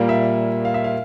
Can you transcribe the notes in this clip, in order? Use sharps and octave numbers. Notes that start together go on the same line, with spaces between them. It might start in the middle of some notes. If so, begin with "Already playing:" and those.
Already playing: A#2 G3 A#3
E5
F5
E5
F5